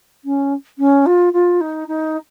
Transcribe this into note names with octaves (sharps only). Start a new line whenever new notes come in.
C#4
C#4
F4
F4
D#4
D#4